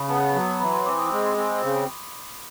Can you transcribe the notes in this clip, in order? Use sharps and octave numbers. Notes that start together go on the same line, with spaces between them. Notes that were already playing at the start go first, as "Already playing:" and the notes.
Already playing: C#3 B5 C#6
B3 A5
F#3
E3 B5
C6
C4 D6
D#6
G#3
C4
C#3